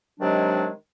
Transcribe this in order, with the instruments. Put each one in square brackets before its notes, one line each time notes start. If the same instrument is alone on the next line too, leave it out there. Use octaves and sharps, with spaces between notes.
[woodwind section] C3 D#3 F#3 G#3 D4